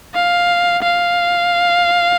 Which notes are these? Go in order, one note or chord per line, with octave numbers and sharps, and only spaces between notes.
F5
F5